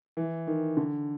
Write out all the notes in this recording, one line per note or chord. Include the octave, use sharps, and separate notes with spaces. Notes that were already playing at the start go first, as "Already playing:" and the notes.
E3
D#3
D3